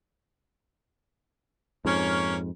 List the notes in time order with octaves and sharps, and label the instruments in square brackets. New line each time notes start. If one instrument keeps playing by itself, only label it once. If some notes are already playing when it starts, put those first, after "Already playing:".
[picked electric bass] F2 G#2 [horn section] A#3 C#4